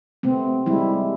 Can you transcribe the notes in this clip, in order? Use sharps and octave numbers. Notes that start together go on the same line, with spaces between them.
C3 A3 B3 C4
G3 G#3 E4